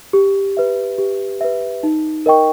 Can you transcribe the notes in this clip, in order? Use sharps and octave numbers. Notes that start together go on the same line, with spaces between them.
G4
B4 E5
G4
B4 E5
D#4
A#4 D#5 G5 C#6